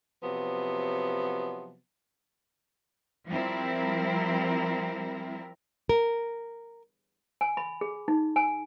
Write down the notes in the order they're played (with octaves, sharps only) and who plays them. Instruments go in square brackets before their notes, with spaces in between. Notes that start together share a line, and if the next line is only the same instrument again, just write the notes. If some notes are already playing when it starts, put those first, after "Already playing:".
[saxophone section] C3 F3 F#3 B3
[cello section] F3 G3 C4 E4 A#4
[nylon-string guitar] A#4
[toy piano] G#5
B5
G#4
D#4
G#5